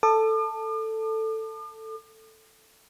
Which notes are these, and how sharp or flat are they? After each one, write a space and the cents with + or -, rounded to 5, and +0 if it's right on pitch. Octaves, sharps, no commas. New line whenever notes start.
A4 +5 D6 +45